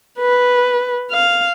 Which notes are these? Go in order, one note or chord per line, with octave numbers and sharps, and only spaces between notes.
B4
F5